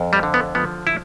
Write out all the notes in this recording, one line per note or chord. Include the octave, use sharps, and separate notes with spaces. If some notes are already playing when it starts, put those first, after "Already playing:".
Already playing: F2
G3
D3
B3
F3 B3
E4